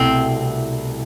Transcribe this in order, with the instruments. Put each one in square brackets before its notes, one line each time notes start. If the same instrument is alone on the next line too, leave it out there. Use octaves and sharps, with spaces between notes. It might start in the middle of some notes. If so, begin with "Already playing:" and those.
Already playing: [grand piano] C2 B2 A3 E4 [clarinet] C4